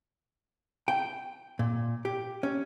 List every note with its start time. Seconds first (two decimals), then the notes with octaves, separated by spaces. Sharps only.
0.88 G5
1.59 A#2
2.05 G4
2.43 C#4